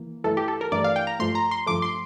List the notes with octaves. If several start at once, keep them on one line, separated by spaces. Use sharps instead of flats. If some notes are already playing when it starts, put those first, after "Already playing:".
Already playing: E3 A#3
G2 E3 A3 A4
G4
A4
A#4
G2 E3 A3 D5
F5
G5
A#5
G2 F3 A3 C6
A#5
C6
G2 F3 A3 D6
C6